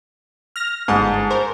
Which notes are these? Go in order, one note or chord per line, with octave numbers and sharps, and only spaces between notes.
F6 A#6
G1 G#2 A5
A#4 C5